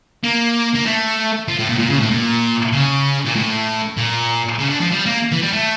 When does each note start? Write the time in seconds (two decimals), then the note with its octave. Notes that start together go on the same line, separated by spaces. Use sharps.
0.24 A#3
0.75 A#3
0.86 A3
1.48 F3
1.59 A2
1.69 A#2
1.79 A#2
1.90 C#3
2.00 A2
2.11 A#2
2.73 C#3
3.26 A#2
3.36 A2
3.97 A#2
4.59 C#3
4.69 D3
4.81 F3
4.91 G3
5.06 A#3
5.32 E3
5.42 G3
5.53 A3